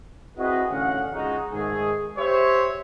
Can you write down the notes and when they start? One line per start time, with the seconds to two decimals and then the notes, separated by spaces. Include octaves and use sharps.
0.38 C4 E4 F#4 G#4 B4 D#5
0.71 A1 D3 C#4 F5 F#5
1.13 C#2 G#3 D#4 F#4
1.53 G#2 D#3 G#3 A3 G#4
2.18 G4 C5 C#5 E5